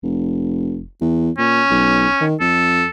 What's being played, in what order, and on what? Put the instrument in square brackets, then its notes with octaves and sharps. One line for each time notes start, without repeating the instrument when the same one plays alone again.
[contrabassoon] F1
E2
[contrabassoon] A#2 [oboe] C#4
[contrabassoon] B1
D#3
[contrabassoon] F2 [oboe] A4